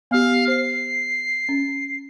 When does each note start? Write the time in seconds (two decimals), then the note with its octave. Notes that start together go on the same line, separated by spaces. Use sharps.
0.11 B3 G4 F5
0.48 C5 C7
1.49 C#4